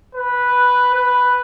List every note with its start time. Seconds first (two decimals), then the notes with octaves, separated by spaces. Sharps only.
0.15 B4
0.94 B4